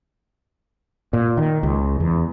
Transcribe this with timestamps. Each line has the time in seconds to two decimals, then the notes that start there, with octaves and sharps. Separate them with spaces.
1.13 A#2
1.37 D#3
1.63 C#2
2.00 E2